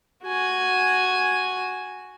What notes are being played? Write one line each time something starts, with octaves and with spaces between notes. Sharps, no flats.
F#4 G#5